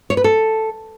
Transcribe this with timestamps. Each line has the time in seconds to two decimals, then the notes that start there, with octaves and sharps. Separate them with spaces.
0.10 C#5
0.17 B4
0.24 A4